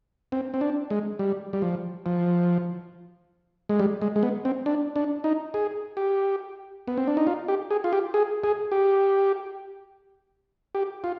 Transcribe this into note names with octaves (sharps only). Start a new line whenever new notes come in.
C4
C4
D4
G#3
G3
G3
F3
F3
G#3
G3
G#3
G#3
B3
C4
D4
D4
D#4
G#4
G4
B3
C4
D4
D#4
F4
G4
G#4
F4
G4
G#4
G#4
G4
G4
F4